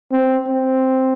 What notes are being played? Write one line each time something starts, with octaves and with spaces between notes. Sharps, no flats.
C4
C4